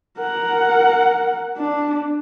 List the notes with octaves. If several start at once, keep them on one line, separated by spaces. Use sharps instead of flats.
A#4 F#5
D4